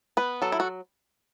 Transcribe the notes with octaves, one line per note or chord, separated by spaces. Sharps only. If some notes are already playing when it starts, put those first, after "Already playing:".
B3 B4
F#3 A4
E4
F#4